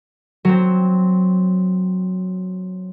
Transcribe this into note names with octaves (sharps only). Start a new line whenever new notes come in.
F#3 C4